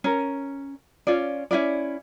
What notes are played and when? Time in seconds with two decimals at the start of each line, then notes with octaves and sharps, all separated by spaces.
0.04 C#4 A#4
1.07 C#4 F4 D5
1.51 C#4 E4 F4 D5